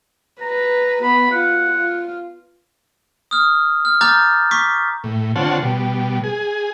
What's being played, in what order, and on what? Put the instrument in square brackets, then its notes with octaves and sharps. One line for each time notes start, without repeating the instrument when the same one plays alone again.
[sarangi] B4 [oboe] A#5
[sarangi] B3 [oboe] B5
[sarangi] F4 [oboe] F#5
[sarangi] F4
[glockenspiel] D#6 F6
F6
A#5 D6 F6 G6 A6
C#6 D6 B6
[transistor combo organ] A2
D3 C4 F4 C#5 F#5 A5
B2 G3
G#4